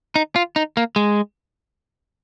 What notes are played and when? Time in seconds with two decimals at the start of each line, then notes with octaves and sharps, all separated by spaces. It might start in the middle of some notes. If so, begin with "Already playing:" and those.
0.16 D#4
0.36 F4
0.56 D#4
0.77 A#3
0.96 G#3